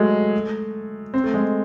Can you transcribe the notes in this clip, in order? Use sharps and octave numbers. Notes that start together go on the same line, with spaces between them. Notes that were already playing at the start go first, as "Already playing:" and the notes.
Already playing: F#3 G#3 A3
C4
A3
G#3